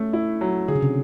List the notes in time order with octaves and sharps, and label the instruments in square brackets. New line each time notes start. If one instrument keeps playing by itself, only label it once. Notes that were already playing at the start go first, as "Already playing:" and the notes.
Already playing: [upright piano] A3 C#4
E4
F#3
[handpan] D3 [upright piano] G#4
[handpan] C#3
C3